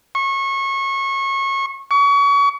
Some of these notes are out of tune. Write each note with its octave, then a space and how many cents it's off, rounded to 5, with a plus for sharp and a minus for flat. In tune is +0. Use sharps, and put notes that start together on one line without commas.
C#6 -25
C#6 +35